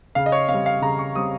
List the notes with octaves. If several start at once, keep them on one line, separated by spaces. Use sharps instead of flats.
C#3 F5
D#5
C#5
C4 F5
G3
F5
C#3 A#5
C#6
G3 C4 D#6